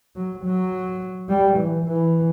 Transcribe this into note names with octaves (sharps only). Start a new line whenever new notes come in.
F#3
F#3
G3
E3
E3